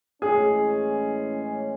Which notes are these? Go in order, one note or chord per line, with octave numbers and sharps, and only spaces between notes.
A2 E3 G#3 C#4 G#4